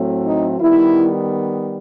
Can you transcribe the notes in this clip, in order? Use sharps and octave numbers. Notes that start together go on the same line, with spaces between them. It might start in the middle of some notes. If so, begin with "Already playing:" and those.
Already playing: A2 F#3 A3 C4
D#4
D#3 G3 B3 E4